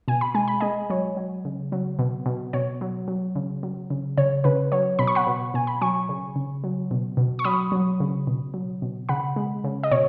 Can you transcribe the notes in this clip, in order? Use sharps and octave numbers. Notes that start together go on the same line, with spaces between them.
B2 G#5
B5
G#3 G#5
B5
G#3 D#5 G#5
F#3 C#5
F#3
C#3
F#3
B2
B2
B2 C#5
F#3
F#3
C#3
F#3
C#3
C#3 C#5
C#3 B4
F#3 C#5
B2 B5
C#6
F#5 B5
B2
B2 G#5
B5
F#3 G#5 C#6
C#3
C#3
F#3
B2
B2
C#6
F#3 B5 D#6
F#3
C#3
B2
F#3
B2
C#3 F#5 B5
G#3
C#3
D#5
B2 C#5